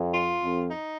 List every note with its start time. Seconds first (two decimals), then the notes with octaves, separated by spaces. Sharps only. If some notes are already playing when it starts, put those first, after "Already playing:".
Already playing: F2
0.14 F4
0.43 F2
0.71 D#4